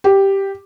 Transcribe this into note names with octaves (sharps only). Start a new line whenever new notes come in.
G4